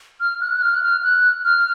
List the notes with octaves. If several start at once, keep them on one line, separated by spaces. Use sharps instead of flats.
F6
F#6
F#6
F6
F#6
F6
F#6
F6